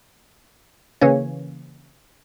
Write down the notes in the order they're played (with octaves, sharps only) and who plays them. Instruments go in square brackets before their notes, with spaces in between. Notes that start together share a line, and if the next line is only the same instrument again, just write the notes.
[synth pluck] C#3 E3 A#3 C#4 C#5